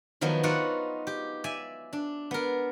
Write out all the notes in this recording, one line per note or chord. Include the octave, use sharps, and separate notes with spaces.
D#3 F3 F#3 B3 D#4
B3 D#4 F4 F#4 D5 F#5
G4
D5 E5 G#5
D4
B3 A#4